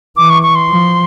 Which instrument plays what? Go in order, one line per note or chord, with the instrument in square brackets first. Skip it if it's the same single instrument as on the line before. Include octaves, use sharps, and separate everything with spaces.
[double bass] E3 [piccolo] D6
[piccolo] C#6
C#6
C6
[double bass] F3